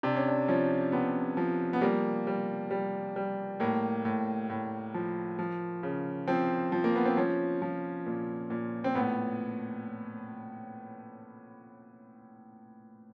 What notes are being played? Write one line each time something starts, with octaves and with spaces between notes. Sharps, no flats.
C3 D4
C#4
D4
F3 C#4
C3 B3
F3
B3
G3 A#3
G3
G3
G3
A2 A#3
A2
A2
F3
F3
C#3
F3 C4
F3
A#3
B3
C4
F3 C#4
F3
A#2
A#2
C4
A2 B3